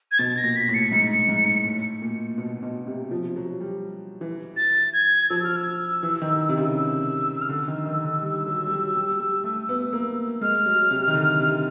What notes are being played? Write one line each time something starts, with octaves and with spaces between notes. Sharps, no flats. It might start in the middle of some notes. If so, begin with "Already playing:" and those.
G#6
B2 A6
A#6
A#2
B6
A2
C#7
G#2 C#7
G#2
A2
A#2
B2
B2
C3
F3
F#3
G3
E3
A6
G#6
F3 E6
F6
E6
E3
D#3
C3
C#3
E6
F6
D3 E6
D#3
D#3
D3
G3
F#3
G3
F#3
G3
G3
A3
B3
A#3
G#3 F6
F#3
C3
D#3
D3
C3